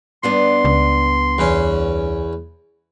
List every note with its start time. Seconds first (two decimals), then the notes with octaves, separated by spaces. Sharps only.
0.23 G2 B3 D4 C6
0.65 C#2
1.38 E2 C#4